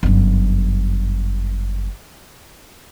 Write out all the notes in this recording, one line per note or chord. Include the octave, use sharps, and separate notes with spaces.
G1 F#2